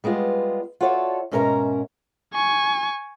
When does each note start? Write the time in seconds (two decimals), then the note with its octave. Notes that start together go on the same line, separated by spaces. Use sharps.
0.04 G3 G#3 B3 F4
0.81 F4 F#4 A4 C#5 D5 E5
1.31 G#2 B2 C#4 A#4 E5 A#5
2.33 G#5 C#6